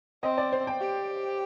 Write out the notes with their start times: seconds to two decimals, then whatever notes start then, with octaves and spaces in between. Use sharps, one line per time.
0.23 C4 D#5
0.38 D5
0.52 C5
0.67 G5
0.81 G4